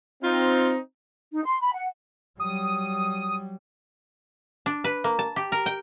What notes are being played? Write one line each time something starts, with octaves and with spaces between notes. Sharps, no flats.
C4 D#4 F4
D#4
C6
B5
F#5
F#3 G3 D#6
D4
B4
A#3
A5
G4
A#4
G5